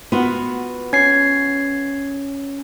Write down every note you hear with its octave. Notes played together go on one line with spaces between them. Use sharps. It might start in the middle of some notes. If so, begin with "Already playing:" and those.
B3 F4 F#4
C#4 G#6 C7